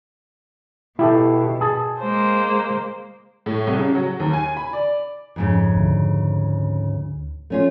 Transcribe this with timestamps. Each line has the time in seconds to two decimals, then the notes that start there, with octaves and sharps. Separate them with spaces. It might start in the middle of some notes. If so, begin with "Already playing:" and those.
0.99 B2 E4 G4 A4
1.61 G#4 A5
2.00 G#3 A#3 C5
3.46 A2
3.67 C2
3.78 C#3
3.95 F#3
4.20 D#2
4.33 G#5
4.57 B5
4.73 D5
5.36 F2 G#2 C#3
5.77 D2
7.50 A3 C#4 F4